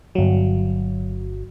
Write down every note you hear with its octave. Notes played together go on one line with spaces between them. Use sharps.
G1 F#3